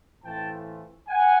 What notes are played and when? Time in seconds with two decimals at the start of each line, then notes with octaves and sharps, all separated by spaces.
0.23 A2 E3 A3 C4 F4 G5 A5
1.09 F#5 G#5